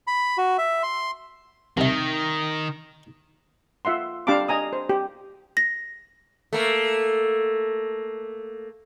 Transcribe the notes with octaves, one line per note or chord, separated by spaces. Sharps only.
B5
F#4
E5
C6
C2 D#3 E5
F4 E5 F#5 C6
D4 G4 F5 A5 B5 D6
D#5 G#5 A#5 D#6
C5
G4
A#6
A3 A#3